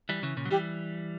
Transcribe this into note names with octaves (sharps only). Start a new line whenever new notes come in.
E3 G3
C#3 E3
A#2 C#3
F#3
E3 G3 G4